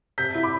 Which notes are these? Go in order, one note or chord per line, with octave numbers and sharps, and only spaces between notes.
C3 G6 B6
E4
B5 D6